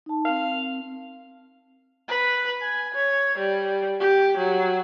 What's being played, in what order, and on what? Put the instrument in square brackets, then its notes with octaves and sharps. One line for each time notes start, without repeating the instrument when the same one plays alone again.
[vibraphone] D#4 A5
[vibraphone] C4 A#4 [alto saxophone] F5
[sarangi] B4
G#5
C#5
G3
G4
F#3